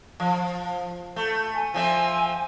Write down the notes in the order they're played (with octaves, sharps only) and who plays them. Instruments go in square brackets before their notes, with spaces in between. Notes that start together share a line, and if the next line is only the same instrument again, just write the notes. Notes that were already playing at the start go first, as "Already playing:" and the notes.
[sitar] F3
A3
[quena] G#5
[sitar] F3 C4 E5